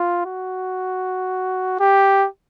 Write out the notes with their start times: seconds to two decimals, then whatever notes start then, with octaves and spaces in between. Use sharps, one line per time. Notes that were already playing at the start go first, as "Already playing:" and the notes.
Already playing: F4
0.26 F#4
1.80 G4